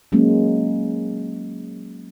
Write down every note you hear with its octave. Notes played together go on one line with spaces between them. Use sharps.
F#3 G#3 A#3 C#4